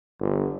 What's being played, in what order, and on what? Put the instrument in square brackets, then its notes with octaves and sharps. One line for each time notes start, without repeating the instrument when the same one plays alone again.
[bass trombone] G1